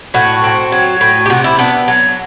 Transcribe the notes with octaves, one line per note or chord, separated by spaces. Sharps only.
A2 F#4
C4
F#3
A2
G4
C3 F#4
E4
B3 D4
F#3